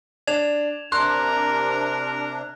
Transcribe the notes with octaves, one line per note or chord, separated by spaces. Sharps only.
D4 G#6 E7 F7
C3 D4 A#4 C6 F#6